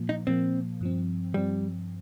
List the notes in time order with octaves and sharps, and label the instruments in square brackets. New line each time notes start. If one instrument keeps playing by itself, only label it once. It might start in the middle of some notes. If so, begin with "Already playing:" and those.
Already playing: [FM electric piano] A#2 F3 A#3
[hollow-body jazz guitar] D#4
[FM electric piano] A#2 F3 A#3 [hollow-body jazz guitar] C4
[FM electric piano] G2 F3 C4
[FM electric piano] G2 F3 C4 [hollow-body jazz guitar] G3